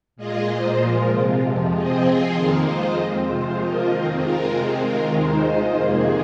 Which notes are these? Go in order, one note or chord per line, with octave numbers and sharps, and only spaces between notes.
A#2 G#3 F4 G#4 D#5
A#2 A#3 F4 C5 D#5
A#2 F3 G#3 F4 A#4
C3 G#3 F4
F2 C3 F3
F3 C4 G#4 D#5
F3 C4 F4 G#4 C5
F2 D#3 A#3 D#4
G#3 F4 C5 D#5
F2 F3 C4
C3 G#3 F4 C5
F3 A#3 F4 A#4 D#5
F2 D#3 C4
G#3 F4 A#4
C3 G#3 C4
D#3 G#3 F4 A#4
D#2 D#3 G#3 D#4 C5
G#3 F4 C5 D#5
F2 C3 D#3 A#3 G#4